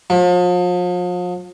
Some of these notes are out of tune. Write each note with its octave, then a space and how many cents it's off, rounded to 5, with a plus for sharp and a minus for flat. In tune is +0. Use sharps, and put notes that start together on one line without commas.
F3 +40